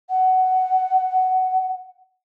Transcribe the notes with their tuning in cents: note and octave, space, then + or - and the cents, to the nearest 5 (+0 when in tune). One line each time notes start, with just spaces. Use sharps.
F#5 +10